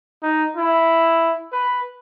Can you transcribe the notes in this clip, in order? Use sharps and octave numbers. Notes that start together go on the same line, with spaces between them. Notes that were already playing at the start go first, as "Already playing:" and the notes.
D#4
E4
B4